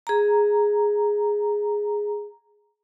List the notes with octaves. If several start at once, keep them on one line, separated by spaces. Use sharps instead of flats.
G#4 A#5